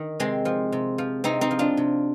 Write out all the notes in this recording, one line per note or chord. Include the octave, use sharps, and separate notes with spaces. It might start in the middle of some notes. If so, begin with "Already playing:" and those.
Already playing: D#3
C3 G#3 C4
F3
C3
F3
C3 C4 D#4
C4 D#4
F3
D4 F4
C3